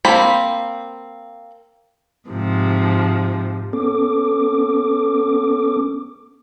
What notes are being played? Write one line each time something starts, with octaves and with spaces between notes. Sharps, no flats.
A#3 C4 B5
G#2 C3 F3
B3 C#4 A4 D6